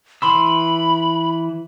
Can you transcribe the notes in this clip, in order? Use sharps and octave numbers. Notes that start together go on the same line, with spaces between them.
E3 B5 C6 E6